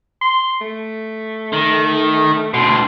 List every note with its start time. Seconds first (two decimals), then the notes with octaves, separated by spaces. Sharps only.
0.22 C6
0.61 A3
1.53 D#3
2.54 D2 B2 C6